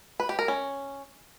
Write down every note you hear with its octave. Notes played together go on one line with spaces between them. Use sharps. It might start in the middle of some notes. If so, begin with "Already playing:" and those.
B4
G4
A#4
C#4